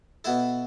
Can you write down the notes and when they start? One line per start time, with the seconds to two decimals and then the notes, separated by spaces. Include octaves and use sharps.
0.24 B2 B3 E4 A4